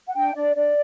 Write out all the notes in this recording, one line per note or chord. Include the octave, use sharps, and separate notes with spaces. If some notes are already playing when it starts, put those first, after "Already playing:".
F#5
D4 G5
D4 D5
D4 D5